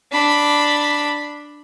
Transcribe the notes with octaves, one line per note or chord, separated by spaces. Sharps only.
D4 B5